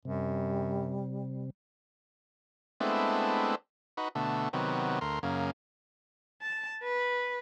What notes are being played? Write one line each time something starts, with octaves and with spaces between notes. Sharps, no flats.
F#2 C3 G3
G#3 A3 B3 C4 D4 E4
D#4 F#4 B4
B2 D3 A3
C3 D#3 F#3 B3
D2 A#4 C6
F#2 C#3 A#3
A5
B4